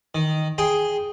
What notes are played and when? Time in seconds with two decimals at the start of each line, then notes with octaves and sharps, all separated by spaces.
0.15 D#3
0.58 G#4 G5 C6